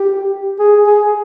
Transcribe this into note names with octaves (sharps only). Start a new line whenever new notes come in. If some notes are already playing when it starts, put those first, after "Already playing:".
Already playing: G4
G#4
G#4